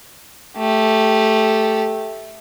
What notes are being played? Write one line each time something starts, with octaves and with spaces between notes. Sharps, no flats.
A3 G4